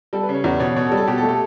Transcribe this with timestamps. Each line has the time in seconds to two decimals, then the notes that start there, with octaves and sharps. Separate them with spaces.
0.13 G3 A4
0.23 B4
0.29 C#3
0.34 C#5
0.44 E2 D5
0.60 B2 C#5
0.76 B2 C#5
0.87 A4
0.92 G3
0.97 A4
1.08 B2 G4
1.18 A4
1.23 A3
1.29 A4